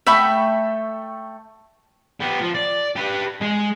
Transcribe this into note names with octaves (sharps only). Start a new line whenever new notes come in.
A3 E5 G5 B5 C#6
B3 G4
F3
D5
G4 B4
G#3